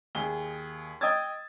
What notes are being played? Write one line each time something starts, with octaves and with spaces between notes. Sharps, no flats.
D#2 G#4 G7
D#5 G5 D#6 E6 G#6 A6